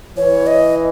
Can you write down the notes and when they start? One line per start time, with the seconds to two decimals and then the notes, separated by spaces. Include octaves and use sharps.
0.16 E3 C#5
0.47 D#5